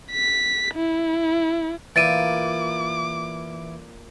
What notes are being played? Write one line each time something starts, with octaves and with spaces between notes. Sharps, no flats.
B6
E4
A#2 E3 D6 A6 D7 D#7